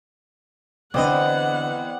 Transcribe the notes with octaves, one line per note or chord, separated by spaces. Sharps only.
E2 D3 B3 C4 D4 D5 D#5 F#5